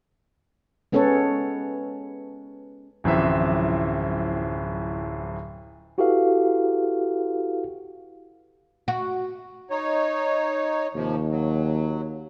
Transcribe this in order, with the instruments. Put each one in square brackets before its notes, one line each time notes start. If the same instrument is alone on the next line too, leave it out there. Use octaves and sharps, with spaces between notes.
[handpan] G#3 B3 C#4 A4 B4 C#5
[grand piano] D1 F#2 E3 F3 C4 E5
[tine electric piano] E4 F#4 G4 A4 B4 F5
[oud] F#4
[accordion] D#4 C#5
[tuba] D#2 [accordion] C3 F3
[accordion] F#3